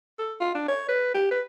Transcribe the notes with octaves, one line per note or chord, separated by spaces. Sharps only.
A4
F4
D4
C#5
B4
G4
B4